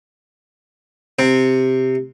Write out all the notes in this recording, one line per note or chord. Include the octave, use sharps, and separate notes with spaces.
C3